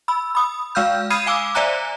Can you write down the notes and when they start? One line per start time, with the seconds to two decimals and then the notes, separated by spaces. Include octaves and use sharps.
0.08 B5 E6
0.35 B5 D#6
0.75 G#3 F5 E6 F6 G6
1.10 B5 D#6 F6 G#6 C7 D#7
1.26 F5 G#5 D6 E6
1.55 C5 D5 E5 G#5 A#5 F#6